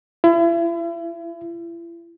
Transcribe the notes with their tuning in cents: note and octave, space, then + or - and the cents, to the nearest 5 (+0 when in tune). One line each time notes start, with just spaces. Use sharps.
E4 +40